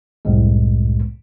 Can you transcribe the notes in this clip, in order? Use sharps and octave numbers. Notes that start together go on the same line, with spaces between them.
C2 F#2 A2 G#3